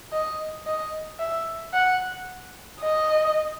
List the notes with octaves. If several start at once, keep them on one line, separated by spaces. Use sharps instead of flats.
D#5
D#5
E5
F#5
D#5